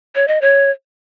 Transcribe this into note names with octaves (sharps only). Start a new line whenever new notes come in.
C#5
D#5
C#5